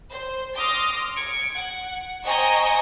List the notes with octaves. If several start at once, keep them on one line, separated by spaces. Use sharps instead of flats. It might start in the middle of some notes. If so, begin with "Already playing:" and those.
C5
C6 D6 D#6 F6 A#6
G#6 C#7 D7
F#5
C5 D#5 G5 G#5 A#5 C#6